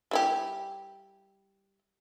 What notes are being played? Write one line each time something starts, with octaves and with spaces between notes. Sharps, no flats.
G3 E4 G4